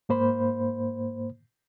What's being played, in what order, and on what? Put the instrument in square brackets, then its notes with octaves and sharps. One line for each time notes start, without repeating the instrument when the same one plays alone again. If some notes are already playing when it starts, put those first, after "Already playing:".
[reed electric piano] G#2 A#3 C5 B5